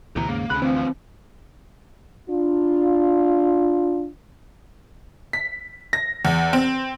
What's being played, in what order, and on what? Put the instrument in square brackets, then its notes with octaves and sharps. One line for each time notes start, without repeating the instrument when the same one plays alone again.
[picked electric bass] D2 B2 E3 [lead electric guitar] G4 A#5
[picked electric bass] D#2 G#2 C#3 [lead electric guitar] A#3
[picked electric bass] D2 C#3 [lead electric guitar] C#4 B5 [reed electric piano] F#6
[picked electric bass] D2 [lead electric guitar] E3 F3 [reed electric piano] C4
[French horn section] D4 F4
[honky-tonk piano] B6
A#6
E2
C4